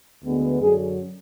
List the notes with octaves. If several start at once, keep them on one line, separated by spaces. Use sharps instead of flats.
D2 D3 G#3 B3
F#2 D3 F#3 G#4